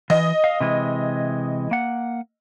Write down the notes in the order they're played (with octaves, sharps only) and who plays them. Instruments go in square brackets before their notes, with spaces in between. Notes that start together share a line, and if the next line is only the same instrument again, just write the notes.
[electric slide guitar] E3 [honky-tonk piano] D#5
[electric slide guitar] F5
C3 E3 G#3
A#3 F#5